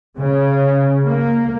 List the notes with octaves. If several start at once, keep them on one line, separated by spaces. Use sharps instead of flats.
C#3
A#3